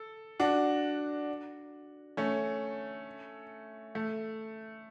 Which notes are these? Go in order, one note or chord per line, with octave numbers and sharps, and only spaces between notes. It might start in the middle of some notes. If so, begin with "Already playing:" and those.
Already playing: A4
D4 F#4
A3 C#4
A3